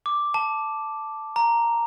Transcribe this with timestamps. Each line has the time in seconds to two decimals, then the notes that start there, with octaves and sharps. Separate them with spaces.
0.06 D6
0.34 A5
1.36 A#5